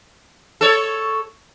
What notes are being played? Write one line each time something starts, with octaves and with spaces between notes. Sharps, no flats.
A4 C#5